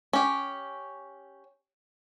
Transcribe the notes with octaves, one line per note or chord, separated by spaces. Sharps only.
C#4 G4